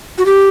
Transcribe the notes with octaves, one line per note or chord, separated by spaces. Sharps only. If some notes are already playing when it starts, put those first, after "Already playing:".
F#4
G4